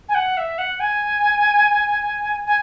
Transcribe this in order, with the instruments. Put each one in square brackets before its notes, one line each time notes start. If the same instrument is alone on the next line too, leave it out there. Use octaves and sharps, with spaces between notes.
[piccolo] G#5
F#5
E5
F#5
G#5
G#5